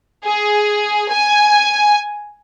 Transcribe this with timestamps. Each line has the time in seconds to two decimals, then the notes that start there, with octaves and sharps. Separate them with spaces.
0.25 G#4
1.10 G#5